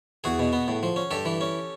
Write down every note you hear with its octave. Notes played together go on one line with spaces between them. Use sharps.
E2 F#4 G#4
B2
B3
A2
F3
C#4
G2 G4 A4
E3
C#4